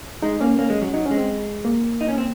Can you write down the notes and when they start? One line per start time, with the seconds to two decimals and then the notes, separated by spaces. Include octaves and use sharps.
0.22 G#3 D#4
0.41 A#3 C#4
0.58 A#3 C#4
0.70 G#3
0.82 F#3
0.94 F#3 D#4
1.06 C#4
1.11 G#3
1.17 C4
1.65 A#3
2.01 D#4
2.08 C#4
2.18 C4